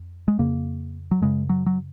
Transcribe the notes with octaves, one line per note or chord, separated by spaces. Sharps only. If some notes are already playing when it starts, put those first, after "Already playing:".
Already playing: F2
G#3
F2 C#3 A#3
F#3
F#2 C#3 G#3
F#3
F#3